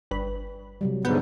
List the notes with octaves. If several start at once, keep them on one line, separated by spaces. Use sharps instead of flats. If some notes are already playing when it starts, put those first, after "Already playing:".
G1 B4
C3 F#3 G3
D2 G#2 B3 G6